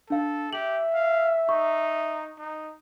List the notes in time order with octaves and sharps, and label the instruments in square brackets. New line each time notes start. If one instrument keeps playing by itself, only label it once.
[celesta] D4 F5 [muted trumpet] A4
[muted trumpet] G4 [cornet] E5 [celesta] F#7
[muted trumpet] F5
[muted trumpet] D#4 [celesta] C#6
[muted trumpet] D#4